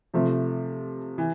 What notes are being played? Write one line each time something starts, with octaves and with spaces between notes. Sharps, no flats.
C3 F3 A3
E3